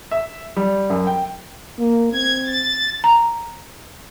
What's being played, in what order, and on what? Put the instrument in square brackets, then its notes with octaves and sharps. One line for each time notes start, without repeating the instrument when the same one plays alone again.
[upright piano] E5
G3
F#2
G5
[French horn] A#3
[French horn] C4 [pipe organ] G#6
[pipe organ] A6
[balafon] A#5